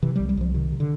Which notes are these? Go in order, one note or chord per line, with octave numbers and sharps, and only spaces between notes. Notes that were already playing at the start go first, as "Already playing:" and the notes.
C3 E3
C2 G3
G3
C2 F3
C3 D#3
C3
D3